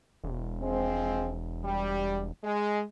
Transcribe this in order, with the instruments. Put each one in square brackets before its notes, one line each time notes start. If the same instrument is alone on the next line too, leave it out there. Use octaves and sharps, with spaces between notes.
[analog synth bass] E1
[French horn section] F3 G#3 C4
G3
G#3